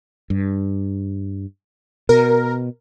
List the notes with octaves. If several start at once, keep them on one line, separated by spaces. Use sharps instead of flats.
G2
B2 A#4